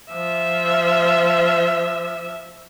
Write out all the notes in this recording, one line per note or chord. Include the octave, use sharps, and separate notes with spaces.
F3 E5